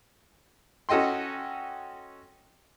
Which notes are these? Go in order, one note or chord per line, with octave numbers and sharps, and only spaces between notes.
C#4 F#4 A4 D#5 G5 C6